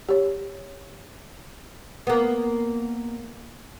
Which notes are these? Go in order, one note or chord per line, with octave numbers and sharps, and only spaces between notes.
G4 C#5
A#3 B3